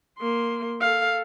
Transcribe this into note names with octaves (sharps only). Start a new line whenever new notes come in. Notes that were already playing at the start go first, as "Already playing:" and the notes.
A#3 C6
A4 F5